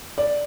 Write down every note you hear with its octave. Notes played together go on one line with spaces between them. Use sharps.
D5